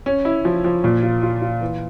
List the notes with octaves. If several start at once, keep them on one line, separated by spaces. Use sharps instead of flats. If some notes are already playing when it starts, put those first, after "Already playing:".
C#4
E4
F3
F3
A#2
F4
F4
F4
E3